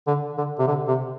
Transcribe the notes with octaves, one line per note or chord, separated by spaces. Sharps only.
D3
D3
C3
D3
C3